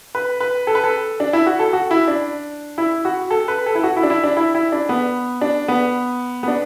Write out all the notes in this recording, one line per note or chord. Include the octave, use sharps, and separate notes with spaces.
B4
B4
A4
B4
A4
D4
E4
F#4
A4
F#4
E4
D4
E4
F#4
A4
B4
A4
E4
F#4
E4
D4
E4
D4
E4
E4
D4
B3
D4
B3
B3
D4